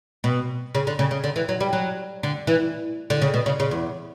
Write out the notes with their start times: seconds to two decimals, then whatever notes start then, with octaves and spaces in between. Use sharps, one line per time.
0.24 B2
0.75 C#3
0.87 D3
0.99 C#3
1.11 C#3
1.24 D3
1.36 E3
1.49 F#3
1.60 G3
1.73 F#3
2.23 D3
2.47 E3
3.10 D3
3.22 C#3
3.34 B2
3.46 C#3
3.60 C#3
3.71 E2